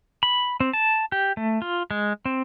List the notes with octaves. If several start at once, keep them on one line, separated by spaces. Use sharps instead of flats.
B5
C4
A5
G4
A3
F4
G#3
C4